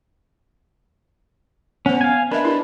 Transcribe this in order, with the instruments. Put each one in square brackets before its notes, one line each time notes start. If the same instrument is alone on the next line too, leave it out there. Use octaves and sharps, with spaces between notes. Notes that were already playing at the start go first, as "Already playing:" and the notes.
[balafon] B3 C5 [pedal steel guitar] C#4
[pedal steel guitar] F5 G#5
[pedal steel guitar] D4 B4 [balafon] A#4 D#5 E5
[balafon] E4 G4 A#4